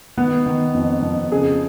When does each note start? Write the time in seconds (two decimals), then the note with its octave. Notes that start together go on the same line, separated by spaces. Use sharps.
0.17 D#3 B3
0.46 D#3
0.74 F2
1.02 F2
1.32 C#3 G#4